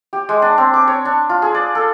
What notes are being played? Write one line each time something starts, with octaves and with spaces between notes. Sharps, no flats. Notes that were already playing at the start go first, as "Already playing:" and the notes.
G4
G#3
D4
C4
D6
C#5
D4
F4
G#4
D5
A4